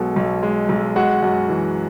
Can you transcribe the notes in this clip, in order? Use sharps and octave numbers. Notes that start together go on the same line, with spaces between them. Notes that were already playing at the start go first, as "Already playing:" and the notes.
Already playing: B1 B2 G#3 A4 G#5
B1
G#3
B1
G#3 F#4 F#5
F#2
E3